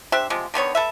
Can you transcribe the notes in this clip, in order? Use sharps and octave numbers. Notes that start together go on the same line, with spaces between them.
D4 G4 C5 E5
C3 F3 G#3
D3 D#3 B3 C#5
A4 B4 E5